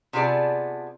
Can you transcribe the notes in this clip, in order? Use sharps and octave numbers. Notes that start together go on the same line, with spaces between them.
C3 B3 F4 G#4 D5 A5